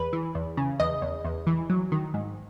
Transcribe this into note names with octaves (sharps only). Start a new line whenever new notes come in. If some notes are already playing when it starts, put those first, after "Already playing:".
Already playing: E2 B4
E3
E2
C#3
E2 D#5
E2
E2
E3
F#3
D#3
G#2